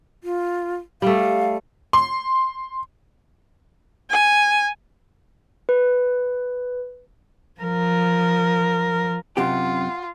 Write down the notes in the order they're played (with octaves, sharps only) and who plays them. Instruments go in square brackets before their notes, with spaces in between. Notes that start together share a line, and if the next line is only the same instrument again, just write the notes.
[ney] F4
[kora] G3 A3 [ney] F5
[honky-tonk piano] C6
[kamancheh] G#5
[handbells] B4
[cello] F3 A#4
[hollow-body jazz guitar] F#2 C3 G4 [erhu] F4 [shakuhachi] F#5